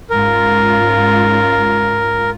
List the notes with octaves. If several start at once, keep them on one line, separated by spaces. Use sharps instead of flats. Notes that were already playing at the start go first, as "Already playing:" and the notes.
G#2 C#4 F4 A#4